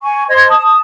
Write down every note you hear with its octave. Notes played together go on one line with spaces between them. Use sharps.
G#5 C#6
C5 D#5 C6 G#6
A5 D#6